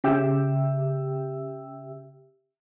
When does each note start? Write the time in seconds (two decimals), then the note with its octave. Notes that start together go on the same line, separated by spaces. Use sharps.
0.04 C#3 G4 E5 G5 E6